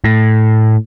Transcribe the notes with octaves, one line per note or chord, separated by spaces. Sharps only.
A2